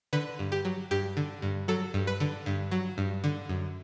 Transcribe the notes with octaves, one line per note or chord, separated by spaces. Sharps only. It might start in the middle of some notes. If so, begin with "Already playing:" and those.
D3 B4
G2
G4
F#3
G2 G4
D3
G2
F#3 A4
G2
B4
D3
G2
F#3
G2
D3
F#2